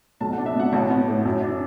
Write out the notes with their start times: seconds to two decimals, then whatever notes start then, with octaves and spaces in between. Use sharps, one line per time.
0.20 B1 A5
0.33 D4 F#5
0.46 E5
0.55 B2 F#5
0.72 A1 A5
0.90 B3
1.08 A2
1.25 F#2
1.43 D4